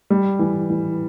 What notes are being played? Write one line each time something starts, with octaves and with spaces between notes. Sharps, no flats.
G3
E3
E3